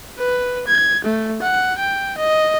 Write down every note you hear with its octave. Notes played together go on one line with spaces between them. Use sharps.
B4
G#6
A3
F#5
G5
D#5